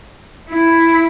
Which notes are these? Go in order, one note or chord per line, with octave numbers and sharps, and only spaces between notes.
E4